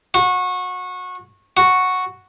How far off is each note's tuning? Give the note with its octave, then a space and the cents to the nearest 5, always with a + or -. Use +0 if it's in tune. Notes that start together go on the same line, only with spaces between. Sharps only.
F#4 -25
F#4 -5